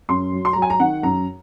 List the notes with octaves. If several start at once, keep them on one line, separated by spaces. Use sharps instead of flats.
F#2 C6
F#3
C6
F#3 A#5
G#5
A#5
D#3 F#5
F#2 A#5